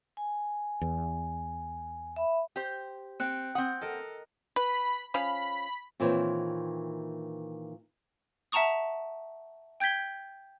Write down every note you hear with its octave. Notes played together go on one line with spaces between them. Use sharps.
G#5
E2
E5 B5
G4 C5
C4 G5 F#6 C#7
C4 F#5 D#6
A4 A#4 D#5
B4 B5
F3 C#4 F5 B5
A#2 D#3 E3 C4 C5 C#5
E5 F#5 A5 A#5 C#6 D#6
G5 G6 G#6 B6 G7